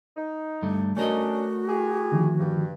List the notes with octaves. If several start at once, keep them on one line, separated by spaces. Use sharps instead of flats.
D#4
G2 D3 A3
A3 C#4 D4 F#4 A#4 D#5
E4 G4 G#4
D3 D#3 F3
G2